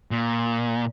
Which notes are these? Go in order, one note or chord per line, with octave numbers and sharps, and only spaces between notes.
A#2